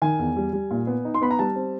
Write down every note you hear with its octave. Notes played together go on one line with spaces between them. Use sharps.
D#3 G#5
E2
G3
G3
A#2
B3
D#4
C6
B3 B5
A#5
G3 A5
C4